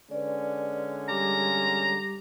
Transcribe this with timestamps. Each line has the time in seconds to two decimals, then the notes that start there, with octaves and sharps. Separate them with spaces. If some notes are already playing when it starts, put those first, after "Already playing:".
0.11 D3 G#3 C#4 B4 D5
1.09 G3 G4 A#5 D6